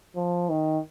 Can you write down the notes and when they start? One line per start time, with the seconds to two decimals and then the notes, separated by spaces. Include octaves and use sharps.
0.16 F3
0.49 D#3